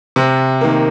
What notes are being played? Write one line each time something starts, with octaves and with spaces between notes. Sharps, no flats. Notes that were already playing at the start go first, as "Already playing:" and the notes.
C3
D#3 A#3